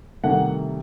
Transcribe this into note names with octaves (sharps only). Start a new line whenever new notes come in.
C2 C3 D#3 A3 F#5